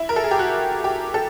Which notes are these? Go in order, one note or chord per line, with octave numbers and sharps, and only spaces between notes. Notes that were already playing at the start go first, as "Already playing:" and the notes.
Already playing: E4
A#4
A4
G#4
G4
F#4
G4
A4